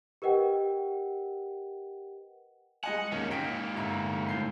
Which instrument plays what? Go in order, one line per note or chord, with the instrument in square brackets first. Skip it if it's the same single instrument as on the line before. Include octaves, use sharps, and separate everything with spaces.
[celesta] G4 A#4 B4 D#5 F#5 G5
[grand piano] G#3 D#5 G#5 [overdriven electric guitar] F#5
[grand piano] D#2 [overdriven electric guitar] C#4 D#4
[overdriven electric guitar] G#2 A#3 [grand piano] G5 B6 D7
[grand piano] G1 E5 A#5
A2 G6 C7